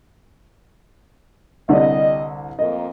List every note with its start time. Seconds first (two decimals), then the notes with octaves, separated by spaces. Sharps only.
1.69 C2 D3 G3 D5 D#5
2.59 F2 A#3 D#5